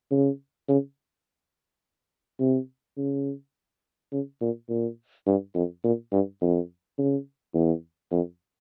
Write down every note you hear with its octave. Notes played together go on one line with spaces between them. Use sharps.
C#3
C#3
C3
C#3
C#3
A#2
A#2
G2
F2
A#2
G2
F2
C#3
E2
F2